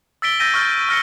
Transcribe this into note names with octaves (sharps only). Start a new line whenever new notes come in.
E6 A6 B6 D7 G7
E6 G6 A6 A#6 D#7
C#6 F6 G6 A6
E6 F6 A#6 C#7 G7